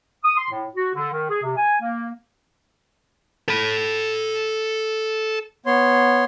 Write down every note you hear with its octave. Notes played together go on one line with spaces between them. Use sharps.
D#6
C6
A2
F#4
D3
D#3
G#4
C3
G#5
A#3
A4 B5
B3 C#5 C6